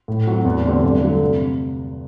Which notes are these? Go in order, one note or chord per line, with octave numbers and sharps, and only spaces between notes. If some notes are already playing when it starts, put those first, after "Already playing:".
A2
F#3 C4 F#4
E2
D3 A3 C4 G4
G2
D3 F#3 A3
C3